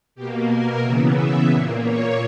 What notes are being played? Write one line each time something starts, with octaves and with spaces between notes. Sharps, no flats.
B2 A#3 G4
A#4
C#3 E3 B3 E5
E5
A#2 A#3
C#5